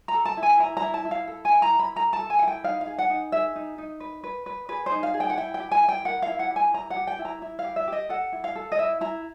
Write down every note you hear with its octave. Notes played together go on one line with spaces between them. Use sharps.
A#5
A4
A5
E4
G#5
E4 A#5
A#5
E4
A5
E4
F5
A4
G#5
E4
A#5
E4
B5
A4 A#5
A5
A4
G#5
F#5
E4
G5
D#4 F5
F5
G#4
F#5
D#4
G#4 E5
D#4
D#4
B4
B4
B4
G#4 B4
C5
D#4
F5
G#4
G5
F#5
E4 G5
G5
G4
G#5
E4
G5
A#4 F#5
F5
E4
F#5
G4
G#5
E4 A#5
F#5
G4
G5
E4
A#5
E4
F5
G4
E5
G4 D#5
A4 F#5
E4
F5
A4
D#5
E4 E5
E4 A#5